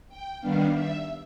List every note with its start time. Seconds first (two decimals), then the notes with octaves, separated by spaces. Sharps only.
0.09 G5
0.40 D#3 G3 B3 D4 F5
0.72 E5